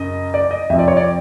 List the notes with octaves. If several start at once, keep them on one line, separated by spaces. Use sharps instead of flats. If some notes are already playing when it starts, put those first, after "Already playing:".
Already playing: F#2 C#3 D#5
D5
D#5
F2 C3 F3 E5
D5
C#5
D5